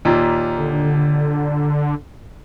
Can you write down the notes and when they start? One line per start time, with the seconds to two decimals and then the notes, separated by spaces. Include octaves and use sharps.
0.05 D#2 A#2
0.57 D3